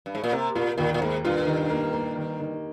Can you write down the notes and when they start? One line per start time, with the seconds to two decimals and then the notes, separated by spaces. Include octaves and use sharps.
0.06 G2
0.15 G#2
0.24 A#2
0.32 C3 A#3
0.55 A#2 F4
0.78 D#2 A#2
0.94 A#2
1.01 G#2 A#3
1.25 G2 F4
1.47 D#3
1.70 A#3
1.93 A#3
2.16 D#3
2.40 D#3